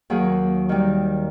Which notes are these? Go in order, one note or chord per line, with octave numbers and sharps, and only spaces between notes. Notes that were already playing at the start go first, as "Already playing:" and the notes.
D#2 F#3 A#3 G#4
D#3 G3